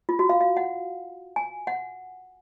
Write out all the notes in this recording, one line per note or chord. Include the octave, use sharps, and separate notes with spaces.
F4
F#4
F5
F5
F#5
G#5
F#5